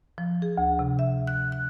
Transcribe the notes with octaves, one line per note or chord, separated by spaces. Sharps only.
F3
G#4
D2
C3
E5
F#6
F#6